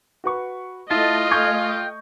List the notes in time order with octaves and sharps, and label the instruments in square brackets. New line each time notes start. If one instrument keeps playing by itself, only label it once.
[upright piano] F#4 B4 C#6
[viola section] A3 D#5 [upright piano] E4 [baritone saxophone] F4 [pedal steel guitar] A5
[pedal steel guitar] F5 G#5 [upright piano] C#6 G6
[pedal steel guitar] G5